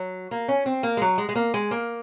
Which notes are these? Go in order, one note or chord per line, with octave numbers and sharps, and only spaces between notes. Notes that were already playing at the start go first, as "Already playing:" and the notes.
Already playing: F#3
A#3
C#4
C4
A#3
G#3
F#3
G#3
G#3
A#3
G#3
A#3